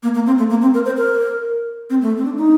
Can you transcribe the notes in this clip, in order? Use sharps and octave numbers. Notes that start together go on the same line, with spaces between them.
A#3
A#3
C4
A3
A#3
C4
A#4
C5
A#4
C4
A3
C4
D4
D#4